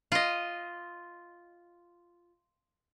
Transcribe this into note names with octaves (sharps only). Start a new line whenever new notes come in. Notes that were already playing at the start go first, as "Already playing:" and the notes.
F4 D#5